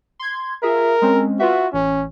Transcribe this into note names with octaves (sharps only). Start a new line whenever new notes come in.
C6 G#6
F4 G#4 A#4 E5
G#3 C4 C#4
F4 F#4 B4 E5
A1 C#4